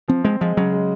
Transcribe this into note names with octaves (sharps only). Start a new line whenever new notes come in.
F3 C4
G#3 C4
F3 G#3
C#3 F#3
G#3